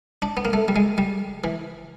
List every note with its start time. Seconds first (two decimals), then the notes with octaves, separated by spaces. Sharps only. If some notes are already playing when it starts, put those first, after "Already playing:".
0.22 D4
0.37 B3
0.45 A#3
0.53 A3
0.68 G3
0.76 G#3
0.98 G3
1.44 E3